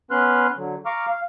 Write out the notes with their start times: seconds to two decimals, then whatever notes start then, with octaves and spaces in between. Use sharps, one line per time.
0.11 B3 C#4 B4 C6 F6 F#6
0.56 D3 F#3
0.86 F5 A#5 C#6 D6 F6
1.10 F5